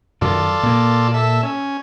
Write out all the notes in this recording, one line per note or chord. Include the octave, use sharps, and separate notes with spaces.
F#2 D#3 F4 A4 D5
A#2 A#3
A4 E5
C#4